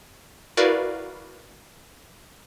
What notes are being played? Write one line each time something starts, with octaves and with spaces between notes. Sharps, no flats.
E4 F#4 A#4 B4 D5 F5